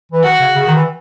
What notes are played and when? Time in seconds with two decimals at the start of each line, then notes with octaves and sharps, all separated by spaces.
0.12 E3
0.23 D#3 F#4
0.40 C#3
0.55 C#3
0.66 D#3
0.75 E3